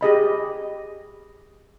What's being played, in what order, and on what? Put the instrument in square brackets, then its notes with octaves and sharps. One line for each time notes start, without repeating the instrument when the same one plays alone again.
[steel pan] G4 G#4 D#5 B5